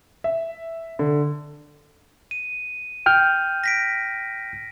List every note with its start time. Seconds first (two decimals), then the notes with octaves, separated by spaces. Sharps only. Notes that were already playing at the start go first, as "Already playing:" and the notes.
0.24 E5
0.99 D3
2.31 D#7
3.06 G5 F6 G6
3.64 A#6 B6 D7